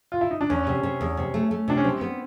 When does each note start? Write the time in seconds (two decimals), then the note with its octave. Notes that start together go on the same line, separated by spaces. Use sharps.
0.12 F4
0.21 E4
0.31 D#4
0.41 D4
0.50 E2 C#4
0.67 C3
0.83 C3
1.01 E2
1.17 C3
1.34 A3
1.51 A3
1.68 C3 D4
1.77 C#4
1.84 G3 C4
2.01 B3